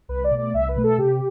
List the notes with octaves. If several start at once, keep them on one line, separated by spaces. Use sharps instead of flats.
C2 B4
D5
B2 A3
D5
C2 E5
B4
B2 A3
A4
C3 G4